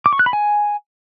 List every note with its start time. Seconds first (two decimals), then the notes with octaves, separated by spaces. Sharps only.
0.06 D6
0.13 C#6
0.19 F#6
0.26 B5
0.33 G#5